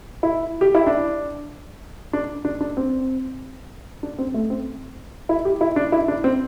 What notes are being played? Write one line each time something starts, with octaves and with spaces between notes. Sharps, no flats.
E4
G4
E4
D4
D4
D4
D4
C4
D4
C4
A3
C4
E4
G4
E4
D4
E4
D4
C4